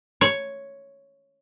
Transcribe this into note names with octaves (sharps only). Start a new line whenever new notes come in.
C#5